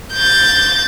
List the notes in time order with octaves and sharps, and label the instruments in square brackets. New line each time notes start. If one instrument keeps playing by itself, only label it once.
[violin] G6 A6